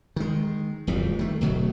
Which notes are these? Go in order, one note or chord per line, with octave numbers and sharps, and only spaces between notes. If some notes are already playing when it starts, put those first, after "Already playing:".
D#3 G#3
D1 F2 G#2 G3
D#3 A3
D1 B2 F#3 A3